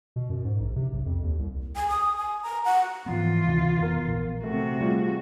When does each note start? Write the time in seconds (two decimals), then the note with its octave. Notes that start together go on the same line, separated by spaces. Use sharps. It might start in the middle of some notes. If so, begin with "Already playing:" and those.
0.16 B2
0.30 F#2
0.45 G#2
0.60 A#1
0.76 C3
0.93 B1
1.06 F2
1.24 D#2
1.39 C2
1.76 G#5
1.88 D#6
2.17 G#5
2.43 A#5
2.65 F#5
3.06 G#2 E3 F3 B3 F4
3.47 D2 C3 D#3
3.79 F1 B3 A#4
4.08 A#1
4.44 C3 A3 F#4
4.81 G3 A3 F4 G#4